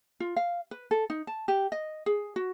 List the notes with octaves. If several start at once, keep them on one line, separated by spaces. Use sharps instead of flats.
F4
F5
B4
A4
D#4
A5
G4
D#5
G#4
F#4